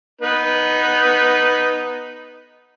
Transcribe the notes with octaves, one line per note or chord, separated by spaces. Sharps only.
B3 D#4 B4